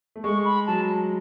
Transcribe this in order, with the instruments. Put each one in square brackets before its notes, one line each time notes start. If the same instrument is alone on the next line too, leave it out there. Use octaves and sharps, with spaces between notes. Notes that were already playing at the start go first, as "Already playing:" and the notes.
[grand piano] A3
[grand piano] G#3 [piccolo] C#6
[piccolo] B5
[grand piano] F#3 [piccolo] A5